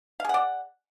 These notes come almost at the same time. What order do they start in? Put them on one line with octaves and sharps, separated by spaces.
F5 G#4 F#5 D5